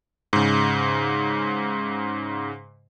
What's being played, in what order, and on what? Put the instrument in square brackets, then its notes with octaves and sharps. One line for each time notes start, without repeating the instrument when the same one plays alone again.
[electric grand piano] G#2 C#3